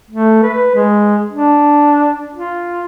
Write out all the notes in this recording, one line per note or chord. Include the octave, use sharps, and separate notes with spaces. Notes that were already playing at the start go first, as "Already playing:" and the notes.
A3
B4
G#3
D4
F4